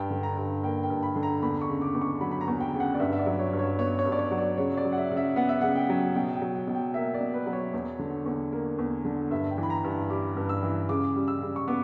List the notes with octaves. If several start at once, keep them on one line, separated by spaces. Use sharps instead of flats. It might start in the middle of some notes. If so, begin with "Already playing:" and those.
Already playing: G2 G5
D3
A#5
G2
A#3 G5
G5
G2
B5
D3
A#5
E2 B5
C#6
C#3
D6
E2
C#6
F#3 B5
B5
A#5
E2
G5
C#3
F#5
D5
G2 E5
E5
D5
F#3
C#5
G2
C#5
B3 C#5
C#5
G2
D5
C#5
F#3
D5
C#3 C#5
D5
F#3
F#5
E5
C#3
E5
B3 F#5
E5
C#3 F#5
G5
F#3
B2 G5
G5
F#3
G5
B2
G5
A#3 E5
D5
B2
B4
F#3
C#5
E2
D3
E2
A#3
E2
D3
G2 E5
G5
E3
B5
A#5
G2
G3 D6
G2
E6
E3
C#3 D6
G3
E6
C#3
C#6
B3 D6